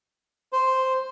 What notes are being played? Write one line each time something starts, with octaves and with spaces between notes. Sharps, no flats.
C5